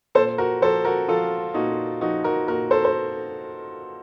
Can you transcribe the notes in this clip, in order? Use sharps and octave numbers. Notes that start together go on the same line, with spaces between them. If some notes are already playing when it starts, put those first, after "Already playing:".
A#2 A4 C5
F#4 A#4
F3 A4 C5
F#4 A#4
F3 F4 A4
A#2 D#4 F#4
F3 D#4 F#4
F#4 A#4
A#2 F#4 A#4
A4 C5
C5